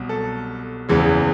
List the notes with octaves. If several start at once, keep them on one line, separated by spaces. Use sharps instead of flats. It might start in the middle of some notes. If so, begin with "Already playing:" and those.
Already playing: C2 B2 F#3
A4
F#1 E2 C#3 E3 G#3